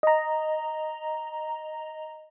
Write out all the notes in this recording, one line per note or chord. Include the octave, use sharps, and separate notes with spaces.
D#5 A#5